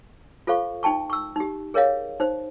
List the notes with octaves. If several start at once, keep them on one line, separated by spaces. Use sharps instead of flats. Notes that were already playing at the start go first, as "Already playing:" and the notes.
F4 A4 C5 F5 C#6
D#4 G5 A5 C#6
C#6 E6
D#4 G4
G#4 A#4 C#5 D#5 F5
D#4 C5